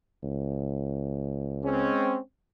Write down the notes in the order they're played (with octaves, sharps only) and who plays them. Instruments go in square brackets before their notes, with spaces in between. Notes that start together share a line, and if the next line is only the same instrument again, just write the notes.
[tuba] C#2
[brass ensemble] G#3 C4 C#4